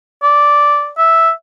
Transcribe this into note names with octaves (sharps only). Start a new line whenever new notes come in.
D5
E5